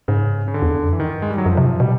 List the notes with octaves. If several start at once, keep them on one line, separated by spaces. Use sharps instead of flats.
G#2 C#3
C#3
D3
E2
F2
F#2 E3
G2 D#3
G#3
G3
F#3
F#2 F3
C3
B2 G3